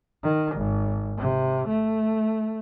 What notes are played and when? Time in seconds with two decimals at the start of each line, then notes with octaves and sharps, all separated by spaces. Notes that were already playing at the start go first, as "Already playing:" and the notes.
0.23 D#3
0.56 G#1
1.18 C3
1.68 A3